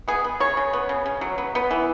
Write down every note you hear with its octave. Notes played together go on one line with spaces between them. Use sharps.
B3 G#4
B3
C#3 C#5
C#3
B3
C#3
C#3
F#3
B3
B3
E3